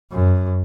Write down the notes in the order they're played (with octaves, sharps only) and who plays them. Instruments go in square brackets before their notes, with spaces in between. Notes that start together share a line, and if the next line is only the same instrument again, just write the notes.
[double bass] F#2